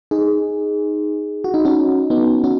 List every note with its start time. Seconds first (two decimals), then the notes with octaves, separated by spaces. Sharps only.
0.11 D#4 G#4
1.44 F#4
1.54 D#4
1.65 C#4 F#4
2.10 B3 D#4
2.44 C#4 F#4